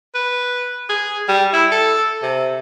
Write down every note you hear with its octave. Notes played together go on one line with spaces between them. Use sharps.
B4
G#4
G3
E4
A4
C3